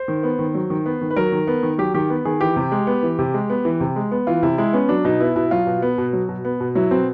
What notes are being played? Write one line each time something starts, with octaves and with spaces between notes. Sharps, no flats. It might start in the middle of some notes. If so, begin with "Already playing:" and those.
Already playing: C5
D#3
B3
D#3
F#3
D#3
B3
D#3
B4
F#3 A#4
D#3
B3
D#3
F#3 G4
D#3 G4
B3
D#3 G#4
E3 G4
C3
G#3
B3
E3
C3
G#3
B3
E3
C3
G#3
B3
E3 F4
C3 E4
G#3 E4
B3 C#4
F#3 D4
B2 D#4
B3 E4
B2 E4
F#3 F4
B2
B3
B2
F#3
B2
B3
B2
F#3 E4
B2 C4